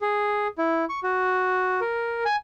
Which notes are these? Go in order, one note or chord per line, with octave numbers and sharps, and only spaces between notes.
G#4
E4
C#6
F#4
A#4
G#5